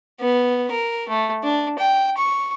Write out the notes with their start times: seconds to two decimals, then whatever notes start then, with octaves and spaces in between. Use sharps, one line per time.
0.21 B3
0.72 A#4
1.09 A3
1.43 D4
1.79 G5
2.18 C#6